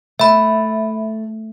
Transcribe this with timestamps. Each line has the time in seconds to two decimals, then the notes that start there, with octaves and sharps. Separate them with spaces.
0.19 A3 E5 B5